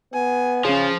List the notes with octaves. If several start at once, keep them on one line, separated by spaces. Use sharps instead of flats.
B3 G#5
C#3 F3 C#4 G#4